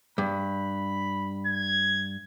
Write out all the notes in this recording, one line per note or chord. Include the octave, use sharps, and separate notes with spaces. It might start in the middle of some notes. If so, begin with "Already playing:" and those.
G2 B5
G#6